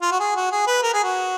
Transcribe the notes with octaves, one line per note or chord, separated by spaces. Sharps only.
F4
F#4
G#4
F#4
G#4
B4
A#4
G#4
F#4